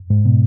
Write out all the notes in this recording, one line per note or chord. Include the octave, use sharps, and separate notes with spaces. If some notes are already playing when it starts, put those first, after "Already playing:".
G#2
B2